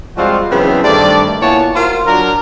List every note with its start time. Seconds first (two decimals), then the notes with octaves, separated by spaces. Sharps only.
0.17 F3 G3 G#3 C4 F4 F#4
0.51 C#3 E3 F#3 B3 C4 D4
0.84 G2 D#3 A3 C4 D5
1.41 A#2 B3 E4 C#5 F#5 A5
1.76 F4 F#4 A#4 C5 F5
2.06 F#3 D4 F#4 A#4